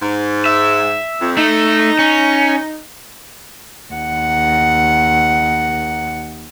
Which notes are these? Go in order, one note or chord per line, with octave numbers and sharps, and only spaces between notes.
G#2
E5
F2
A3 D#4
C#4
D#2 F#5